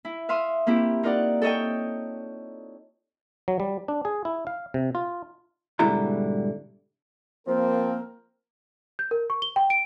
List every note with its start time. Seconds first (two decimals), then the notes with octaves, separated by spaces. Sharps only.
0.05 E4
0.29 E5 F5 C6 D#6
0.67 A#3 C4 E4 G4
1.03 D#4 F4 A#4 D5 F#5
1.42 A4 C#5 D#5 G5
3.48 F#3
3.60 G3
3.88 D4
4.05 G#4
4.25 E4
4.47 F5
4.74 C3
4.95 F4
5.79 G#2 B2 D3 G3 E4 A#5
7.47 F3 A#3 C4 A#4
8.99 G6
9.11 A#4
9.30 C#6
9.42 G7
9.56 G5
9.70 D7